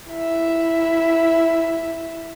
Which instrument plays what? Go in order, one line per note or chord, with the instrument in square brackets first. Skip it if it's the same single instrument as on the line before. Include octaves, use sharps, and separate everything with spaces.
[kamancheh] E4 E5